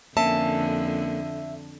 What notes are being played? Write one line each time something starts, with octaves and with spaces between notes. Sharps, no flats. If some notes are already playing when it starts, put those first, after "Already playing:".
F2 D3 A#3 C#4 E5 A5